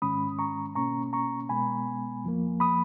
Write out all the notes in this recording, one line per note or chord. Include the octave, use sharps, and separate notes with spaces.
G#2 D#3 G#3 C#4 B5 D#6
A#5 C#6
B2 A#3 C#4 A#5 C#6
A#5 C#6
B2 G#3 B3 G#5 B5
F2 F3 A#3
B5 D#6